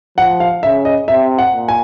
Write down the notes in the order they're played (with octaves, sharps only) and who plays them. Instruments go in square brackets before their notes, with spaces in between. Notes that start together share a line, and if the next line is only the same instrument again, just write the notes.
[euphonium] F3 [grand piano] F#5
[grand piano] F5
[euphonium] C#3 [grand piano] E5
[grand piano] D#5
[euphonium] C3 [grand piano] E5
[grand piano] F#5
[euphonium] A#2
[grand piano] G#5